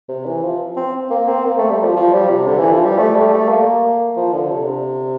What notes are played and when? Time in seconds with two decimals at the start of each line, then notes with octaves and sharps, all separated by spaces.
0.09 C3
0.26 E3
0.43 F3
0.77 C4
1.10 A#3
1.28 C4
1.45 A#3
1.58 A3
1.70 G3
1.83 F3
1.96 F3
2.13 G3
2.30 C3
2.47 D3
2.59 E3
2.72 F3
2.85 G3
2.98 A3
3.15 G3
3.32 A3
3.49 A#3
4.17 F3
4.33 D3
4.51 C3